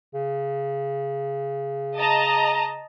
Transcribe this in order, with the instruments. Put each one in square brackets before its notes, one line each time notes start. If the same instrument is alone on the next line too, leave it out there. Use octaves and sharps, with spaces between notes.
[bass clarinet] C#3
[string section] D#5 A5 A#5